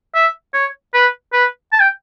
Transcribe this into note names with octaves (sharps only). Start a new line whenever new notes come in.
E5
C#5
B4
B4
A5
G5